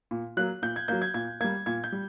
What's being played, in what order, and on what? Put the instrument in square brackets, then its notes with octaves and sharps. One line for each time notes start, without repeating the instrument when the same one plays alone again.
[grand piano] A#2
F#3 A#3 F#6
A#2 G6
G#6
F#3 A#3 G6
G#6
A#2 G#6
A#3 G#6
G3
A#2 G#6
G6
G3